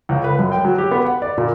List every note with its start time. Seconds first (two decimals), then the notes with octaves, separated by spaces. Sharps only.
0.09 C#2
0.24 B4
0.39 F#2
0.52 G5
0.65 F#3
0.78 G4
0.91 B3
1.05 F#5
1.22 D5
1.38 A#2